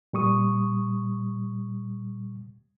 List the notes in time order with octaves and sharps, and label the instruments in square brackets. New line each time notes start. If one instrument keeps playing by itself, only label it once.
[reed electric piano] A#2 G3 C#6 D#6